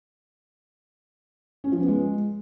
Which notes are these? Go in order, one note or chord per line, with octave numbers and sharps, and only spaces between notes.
C#4
F3
B3
G#3